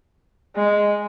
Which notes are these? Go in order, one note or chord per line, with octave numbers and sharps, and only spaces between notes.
G#3